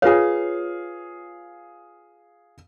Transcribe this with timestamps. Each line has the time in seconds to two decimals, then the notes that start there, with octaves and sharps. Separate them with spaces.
0.02 F4 G#4 B4 C#5 F5